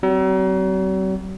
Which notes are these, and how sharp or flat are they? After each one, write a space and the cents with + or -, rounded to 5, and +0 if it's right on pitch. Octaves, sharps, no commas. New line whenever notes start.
F#3 +40 C4 -10